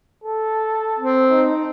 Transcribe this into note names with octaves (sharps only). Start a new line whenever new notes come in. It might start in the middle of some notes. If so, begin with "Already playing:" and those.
A4
C4
D#4